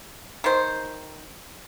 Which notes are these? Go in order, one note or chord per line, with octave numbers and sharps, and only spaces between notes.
D#3 C5